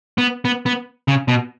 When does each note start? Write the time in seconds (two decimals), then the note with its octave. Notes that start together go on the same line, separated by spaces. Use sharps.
0.18 B3
0.45 B3
0.66 B3
1.08 C#3
1.28 B2